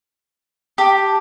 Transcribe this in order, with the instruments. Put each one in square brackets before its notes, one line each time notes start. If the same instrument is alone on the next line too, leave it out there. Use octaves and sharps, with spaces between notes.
[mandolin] G4 [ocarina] A5